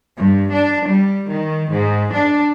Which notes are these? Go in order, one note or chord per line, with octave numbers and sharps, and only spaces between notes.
G2
D4
G3
D#3
G#2
D4